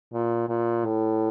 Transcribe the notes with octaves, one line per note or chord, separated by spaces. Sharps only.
A#2
A#2
A2